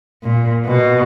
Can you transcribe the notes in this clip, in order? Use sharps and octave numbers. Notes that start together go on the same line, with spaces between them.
A#2
B2